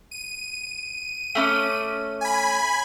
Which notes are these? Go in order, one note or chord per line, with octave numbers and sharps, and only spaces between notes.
D#7
A3 C#4 D6
G#5 B5